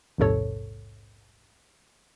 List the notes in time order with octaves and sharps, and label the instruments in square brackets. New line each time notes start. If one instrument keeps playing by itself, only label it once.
[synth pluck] A#1 D#2 G#2 C3 A4 C#5